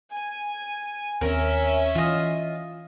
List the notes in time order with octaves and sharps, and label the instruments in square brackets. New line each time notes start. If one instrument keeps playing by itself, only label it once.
[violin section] G#5
[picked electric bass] D#2 C4 [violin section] C#4 E5 [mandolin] A#4
[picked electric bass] E3 [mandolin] F4 D#5